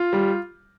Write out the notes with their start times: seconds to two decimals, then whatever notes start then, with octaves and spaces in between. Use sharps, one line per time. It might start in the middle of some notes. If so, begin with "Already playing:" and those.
Already playing: F4
0.13 G3